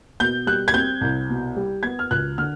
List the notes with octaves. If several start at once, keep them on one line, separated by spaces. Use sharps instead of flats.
B2 G6
G3 F#6
G#6
C4 G6
C2
B2
G3
B3 G#6
F6
C#2 F#6
D3 F6